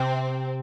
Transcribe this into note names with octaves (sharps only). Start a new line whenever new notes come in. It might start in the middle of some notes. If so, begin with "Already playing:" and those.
Already playing: C3 C4